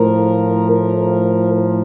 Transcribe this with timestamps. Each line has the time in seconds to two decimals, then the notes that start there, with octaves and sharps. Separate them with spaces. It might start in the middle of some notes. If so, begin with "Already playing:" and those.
Already playing: A2 F3 A#4
0.71 A#4
1.53 A#4